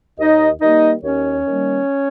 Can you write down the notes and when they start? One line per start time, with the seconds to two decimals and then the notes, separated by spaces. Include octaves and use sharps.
0.18 D#2 D#4 D#5
0.61 D#3 G3 A#3 D#4 D#5
1.04 D#2 C#4 C#5
1.46 D#3 G3 A#3